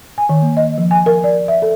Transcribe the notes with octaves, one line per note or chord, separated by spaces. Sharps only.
G#5
D#3
A#3
D#5
F3
G#5
A#4
D5
E5
A4